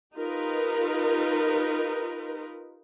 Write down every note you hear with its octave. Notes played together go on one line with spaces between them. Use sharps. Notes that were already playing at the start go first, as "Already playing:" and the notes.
D#4 F4 G4 A#4 B4